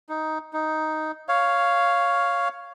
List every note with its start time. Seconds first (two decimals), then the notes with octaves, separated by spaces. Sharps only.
0.09 D#4
0.53 D#4
1.29 C#5 F5